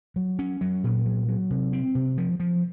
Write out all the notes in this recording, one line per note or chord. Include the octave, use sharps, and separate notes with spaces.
F#3
C#4
F#3
A#2
F#3
F#3
C3
C4
C3
F3
F3